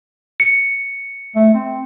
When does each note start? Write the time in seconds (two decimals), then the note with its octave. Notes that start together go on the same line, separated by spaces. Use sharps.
0.40 C#7
1.35 A3
1.54 C4